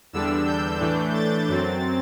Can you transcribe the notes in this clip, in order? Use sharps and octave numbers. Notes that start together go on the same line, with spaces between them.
E2 D3 G3 D4 E6
G6
A2 E3 A3 D4
A6
F#2 F#3 C4